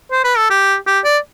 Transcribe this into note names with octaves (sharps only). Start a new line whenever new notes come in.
C5
B4
A4
G4
G4
D5